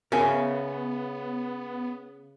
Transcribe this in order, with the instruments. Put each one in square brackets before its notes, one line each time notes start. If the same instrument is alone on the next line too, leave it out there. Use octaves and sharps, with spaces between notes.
[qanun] C#3 [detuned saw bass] B3 [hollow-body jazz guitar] A#4 E5 G#5